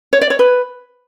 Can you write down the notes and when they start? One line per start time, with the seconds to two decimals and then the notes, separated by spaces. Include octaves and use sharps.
0.13 C#5
0.21 D5
0.30 C#5
0.39 B4